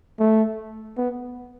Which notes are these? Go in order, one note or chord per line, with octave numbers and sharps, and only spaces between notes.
A3
B3